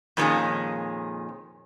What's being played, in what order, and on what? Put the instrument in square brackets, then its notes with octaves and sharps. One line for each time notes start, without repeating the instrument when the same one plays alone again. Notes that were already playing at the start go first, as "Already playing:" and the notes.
[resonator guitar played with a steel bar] F2 A#2 D#3 E3 G#3 C#4